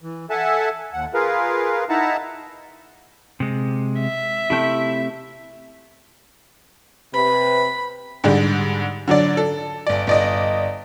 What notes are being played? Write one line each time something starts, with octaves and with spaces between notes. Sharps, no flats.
E3
A4 E5 F#5 G#5 A5
D#2 F#5
F4 G#4 A#4 B4 F5
D#4 E4 E5 F#5 A5 A#5
C3 G#3
E5
C3 A3 E4 G5
C3 B4 B5
G#2 D3 G3 G#3
D3 F#3 D4 D5
A4
G1 D5
G1 D5 D#5